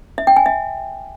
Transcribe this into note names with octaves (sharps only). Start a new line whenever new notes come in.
E5
G5
G#5
E5